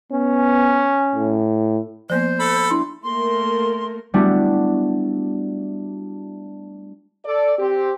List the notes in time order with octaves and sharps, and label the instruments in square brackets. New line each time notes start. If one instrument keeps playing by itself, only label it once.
[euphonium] B3 [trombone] C#4
[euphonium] A2
[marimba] F3 A#3 B3 [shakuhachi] C5
[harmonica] A4 B5
[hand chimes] D4 E4 C6
[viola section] A3 A#3 A#4 [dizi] C6
[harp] G3 A3 B3 D4 E4 F#4
[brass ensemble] A4 D5
C4 G4